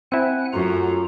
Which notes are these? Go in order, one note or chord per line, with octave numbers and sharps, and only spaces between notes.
C4 E4 F#5 G#5 F#6
F#2 A3 C#4 F4 F#4 A#5